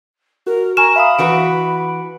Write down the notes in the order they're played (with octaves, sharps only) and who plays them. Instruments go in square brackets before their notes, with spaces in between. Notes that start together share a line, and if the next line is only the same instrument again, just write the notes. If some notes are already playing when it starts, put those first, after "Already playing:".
[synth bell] F#4 [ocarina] A#4
[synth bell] G#5 C#6 F6 [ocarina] A#5 [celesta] E7
[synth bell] E5 F5 D#6 [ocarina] B5
[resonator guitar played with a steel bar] E3 F#4 B4 [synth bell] D7